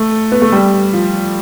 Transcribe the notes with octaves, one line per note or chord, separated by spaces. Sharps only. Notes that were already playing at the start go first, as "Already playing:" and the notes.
Already playing: A3
B3
A3
G3
F3